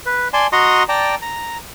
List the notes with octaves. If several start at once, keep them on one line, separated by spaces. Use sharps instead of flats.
B4
D5 G#5 A5 C6
F#4 D#5 A#5 C6 C#6 D#6
D5 G5 A5 A#5
A#5